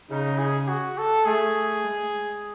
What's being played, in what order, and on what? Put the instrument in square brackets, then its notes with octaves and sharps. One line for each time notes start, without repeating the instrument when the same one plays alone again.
[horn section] C#3 [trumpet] D#4
[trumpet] G#4
F#4
A4
[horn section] A3 [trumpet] G#4
[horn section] G#3